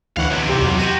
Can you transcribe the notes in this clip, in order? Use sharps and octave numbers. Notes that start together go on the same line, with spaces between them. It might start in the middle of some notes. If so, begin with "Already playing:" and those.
D2 E3 C#5 F5 F#5
B1 C3
C2 G4
E2 F#3
F#4 G4 D#7